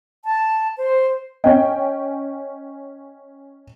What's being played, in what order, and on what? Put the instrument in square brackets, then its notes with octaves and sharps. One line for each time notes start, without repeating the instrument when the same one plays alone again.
[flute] A5
C5
[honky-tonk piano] C#4 G5 [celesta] D#5